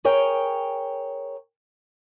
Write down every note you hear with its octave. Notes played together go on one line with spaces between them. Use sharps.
G#4 A#4 C#5 G5